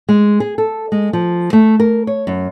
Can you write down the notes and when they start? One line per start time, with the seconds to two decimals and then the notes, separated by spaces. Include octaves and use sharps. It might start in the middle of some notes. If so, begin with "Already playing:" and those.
0.09 G#3
0.40 G#4
0.58 A4
0.92 G#3
1.13 F3
1.53 A3
1.80 A#4
2.07 C#5
2.27 F#2